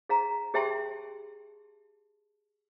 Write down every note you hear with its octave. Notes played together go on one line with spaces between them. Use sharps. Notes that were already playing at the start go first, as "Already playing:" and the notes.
G#4 F5 A#5
G4 G#4 E5 G5 A5 C6